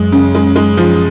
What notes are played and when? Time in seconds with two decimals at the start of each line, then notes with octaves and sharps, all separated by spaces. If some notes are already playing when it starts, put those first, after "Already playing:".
Already playing: F#2 G#3
0.12 C#3
0.35 G#3
0.56 G#3
0.77 F3